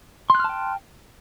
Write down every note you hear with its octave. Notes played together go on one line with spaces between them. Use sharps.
G5 A5 C6 F6 F#6